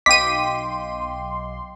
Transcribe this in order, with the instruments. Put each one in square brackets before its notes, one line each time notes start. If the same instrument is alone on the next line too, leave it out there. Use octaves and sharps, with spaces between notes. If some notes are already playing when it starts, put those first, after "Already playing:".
[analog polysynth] B1 C6 [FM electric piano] D#5 F5 G5 [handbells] D6 [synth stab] B6 D#7